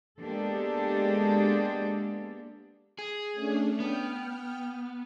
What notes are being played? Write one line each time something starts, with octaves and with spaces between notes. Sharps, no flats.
G#3 A#3 B3 D4 G4 A4
G#4
A3 C#4 D4
B3 G5 F6